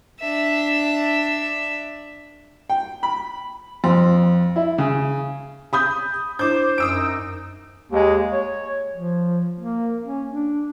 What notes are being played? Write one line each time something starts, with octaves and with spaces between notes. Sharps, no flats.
D4 E5
G5
B5
F2
E4
C#3
B5 D#6 G6
D4 E4 C5 D6 G6
F#2 D#6 E6 D7
D#4
D#2 G#3
C#5
F3
A#3
C#4
D4